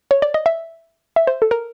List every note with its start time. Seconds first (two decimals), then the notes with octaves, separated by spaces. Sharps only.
0.11 C#5
0.22 D5
0.34 D#5
0.46 E5
1.16 E5
1.27 C5
1.42 A4
1.51 A#4